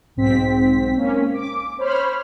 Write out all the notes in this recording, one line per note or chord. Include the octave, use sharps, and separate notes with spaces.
B1 G#2 C4 B6
A#3 C#4
D6
C5 C#5 B5 F6